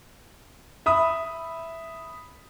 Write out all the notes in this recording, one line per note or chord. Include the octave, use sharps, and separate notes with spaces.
E5 B5 D#6